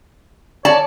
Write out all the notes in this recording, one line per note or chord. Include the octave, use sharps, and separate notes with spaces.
C#5 D5 A5